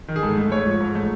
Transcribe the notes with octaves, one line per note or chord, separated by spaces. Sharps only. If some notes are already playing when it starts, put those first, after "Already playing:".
D#3
G#4
G#2 A4
A3
G#2 C#5
F3
G#2
A3